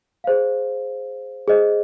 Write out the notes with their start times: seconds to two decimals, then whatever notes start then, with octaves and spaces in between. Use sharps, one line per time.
0.24 G#4 C5 F5
1.48 G#4 C5 D#5